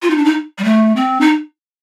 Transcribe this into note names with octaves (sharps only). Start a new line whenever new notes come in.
F4
D#4
D4
D#4
G3
A3
C4
D#4